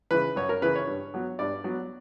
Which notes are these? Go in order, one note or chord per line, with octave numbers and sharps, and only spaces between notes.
C#3 E3 B4
F#2 C#5
A#4
C#3 E3 B4
C#5
G2
F#3 B3
G2 D5
F#3 B3